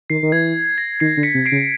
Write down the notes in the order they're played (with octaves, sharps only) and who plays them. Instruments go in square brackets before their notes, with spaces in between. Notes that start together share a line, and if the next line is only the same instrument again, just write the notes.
[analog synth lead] D#3 [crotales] C7
[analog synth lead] D#3
[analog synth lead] E3 [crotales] G#6
[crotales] A#6
[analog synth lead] D#3 [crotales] C7
[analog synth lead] D3
[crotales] B6 C#7
[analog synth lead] C3
[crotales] C7 D7
[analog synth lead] C#3